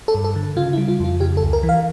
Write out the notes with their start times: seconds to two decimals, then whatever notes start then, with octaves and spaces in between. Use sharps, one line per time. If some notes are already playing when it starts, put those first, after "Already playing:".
0.08 A4
0.15 G2
0.24 A4
0.36 D3
0.56 C#3 F4
0.73 E4
0.78 G3
0.88 F4
1.00 F2 F4
1.20 C#3 G4
1.37 A4
1.43 C#2
1.53 A#4
1.63 E3
1.69 F5